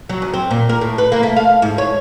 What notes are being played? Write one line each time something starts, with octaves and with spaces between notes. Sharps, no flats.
F#3
F#2
C4
A#2
A#4
A2
B4
A#3
A3
F5
G#2
C#5